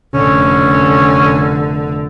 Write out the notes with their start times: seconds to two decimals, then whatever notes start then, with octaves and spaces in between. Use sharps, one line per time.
0.14 F1 D3 C#4